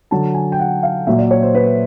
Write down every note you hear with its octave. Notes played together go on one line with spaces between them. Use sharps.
D3 F#3 A5
G#5
G5
F#5
F5
A#2 F#3 E5
D5
C#5
C5
B4